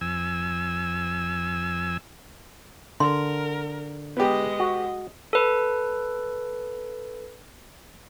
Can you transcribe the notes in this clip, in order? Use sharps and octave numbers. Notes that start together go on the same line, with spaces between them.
F2 G#5 E6
D3 A#4 C6
G#3 B3 G4 D#5
F#4
A4 B4